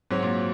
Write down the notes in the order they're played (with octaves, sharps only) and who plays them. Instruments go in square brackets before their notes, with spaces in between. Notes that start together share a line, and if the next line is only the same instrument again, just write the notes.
[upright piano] G#2 [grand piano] F#3 C4 F#4 C#5
[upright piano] A#2